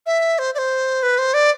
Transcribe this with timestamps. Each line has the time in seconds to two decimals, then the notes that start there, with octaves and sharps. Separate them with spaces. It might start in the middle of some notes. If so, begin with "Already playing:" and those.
0.06 E5
0.39 C5
0.55 D5
0.58 C5
1.03 B4
1.18 C5
1.34 D5